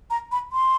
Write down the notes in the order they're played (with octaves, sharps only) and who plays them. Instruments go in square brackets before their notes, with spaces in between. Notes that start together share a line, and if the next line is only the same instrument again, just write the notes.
[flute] A#5
B5
C6